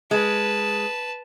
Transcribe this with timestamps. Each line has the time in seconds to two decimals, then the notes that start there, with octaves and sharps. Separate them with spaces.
0.11 G#3 B4 A5